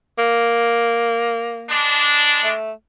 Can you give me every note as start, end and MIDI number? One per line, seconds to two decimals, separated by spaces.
0.18 1.77 58
1.70 2.51 56
1.70 2.51 62
2.43 2.72 57